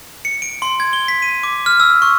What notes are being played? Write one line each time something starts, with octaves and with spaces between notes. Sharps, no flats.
C#7
D7
C6
G#6
G7
B6
D#7
D6
F6
E6
C#6